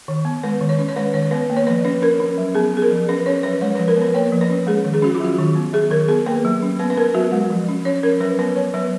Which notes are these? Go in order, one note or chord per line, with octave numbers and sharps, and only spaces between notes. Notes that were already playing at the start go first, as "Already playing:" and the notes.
D#3
B3
G#3 B4
D#3
C#5
C#4
C#5
G#3 B4
D#3 C#5
B3 B4
A#3
C#5
F3 B4
C#4 B4
C#4 A#4
C#4
F#3
B3 G#4
B3 G#4
A#4
F3
C#4 B4
C#4 C#5
F#3 B4
G#3 C#5
F3 B4
A#4
B3
B4
A#3 C#5
F3
B4
C#4
G#3 G#4
D#3
G#4
C#4 F#4
F4
F#3 F#4
D#3
B3
F#3 G#4
D#3 A#4
B3 G#4
A#3 B4
F#3
C#4
B3 B4
B4
B3 A#4
F#3 F#4
G#3
F3
C#4
C#4 C#5
C#4 A#4
F#3 B4
B3 B4
B3 C#5
F#3 B4